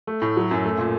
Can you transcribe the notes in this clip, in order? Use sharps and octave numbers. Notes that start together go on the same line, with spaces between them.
A3
A2
F#3
F#2
A3
A#2